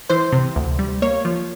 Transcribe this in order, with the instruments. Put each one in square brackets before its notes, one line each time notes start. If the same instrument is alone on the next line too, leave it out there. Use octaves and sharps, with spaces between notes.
[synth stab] E3 C5
C3
D2
G3
A#3 C#5
F3